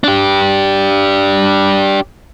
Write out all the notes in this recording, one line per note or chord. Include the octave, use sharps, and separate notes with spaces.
D4 G4